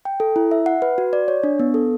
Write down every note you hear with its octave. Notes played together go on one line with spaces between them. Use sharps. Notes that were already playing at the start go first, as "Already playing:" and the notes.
G5
A4
E4
E5
F#5
B4
F#4
D5
C#5
D4
B3
A4